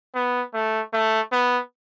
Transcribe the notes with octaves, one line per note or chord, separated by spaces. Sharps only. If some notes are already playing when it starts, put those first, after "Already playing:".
B3
A3
A3
B3